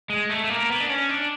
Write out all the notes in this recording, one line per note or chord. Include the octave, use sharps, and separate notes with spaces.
G#3
A3
A3
A#3
B3
D4
C#4
D4